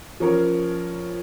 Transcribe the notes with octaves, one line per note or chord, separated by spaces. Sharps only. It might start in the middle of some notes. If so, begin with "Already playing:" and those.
F3 C#4 A#4 C#5